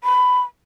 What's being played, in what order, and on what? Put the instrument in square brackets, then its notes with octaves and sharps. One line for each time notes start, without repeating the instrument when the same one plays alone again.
[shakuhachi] B5